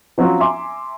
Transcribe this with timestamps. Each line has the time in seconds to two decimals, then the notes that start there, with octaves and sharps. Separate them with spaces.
0.18 F3 F#3 C4 C#4 F4 F#4
0.40 E5 G#5 A#5 C6 D6